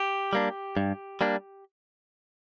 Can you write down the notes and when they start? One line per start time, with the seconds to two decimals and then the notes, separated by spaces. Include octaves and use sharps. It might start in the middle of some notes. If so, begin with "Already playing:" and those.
Already playing: G4
0.33 G3 A#3 D4
0.77 G2
1.21 G3 A#3 D4